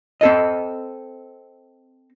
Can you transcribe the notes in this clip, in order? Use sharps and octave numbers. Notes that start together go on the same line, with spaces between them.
C4 A4 D#5